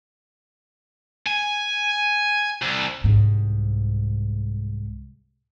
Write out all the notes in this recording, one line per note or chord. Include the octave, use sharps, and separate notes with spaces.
G#5
C2
C2 G#2